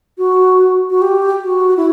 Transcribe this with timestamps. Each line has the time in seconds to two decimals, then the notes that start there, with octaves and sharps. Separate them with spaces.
0.18 F#4
0.90 F#4
1.02 G4
1.44 F#4
1.77 E4